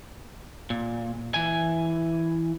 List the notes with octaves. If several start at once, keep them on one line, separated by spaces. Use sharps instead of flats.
A#2
E3 G#5